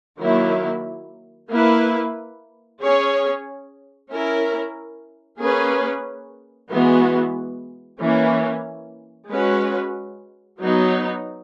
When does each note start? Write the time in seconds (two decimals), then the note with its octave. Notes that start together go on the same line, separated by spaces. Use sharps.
0.20 D#3 F#3 A#3 E4
1.50 A#3 E4 B4
2.81 C#4 G#4 C#5
4.11 C#4 E4 A#4
5.40 A#3 C#4 G#4 B4
6.70 E3 G#3 B3 F#4
8.00 E3 A#3 C#4
9.30 G#3 C#4 F#4 B4
10.61 F#3 B3 D#4